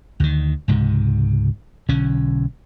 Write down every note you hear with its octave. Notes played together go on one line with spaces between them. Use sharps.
D2 D#3
C#2 G#2 C3
B1 D3 C#4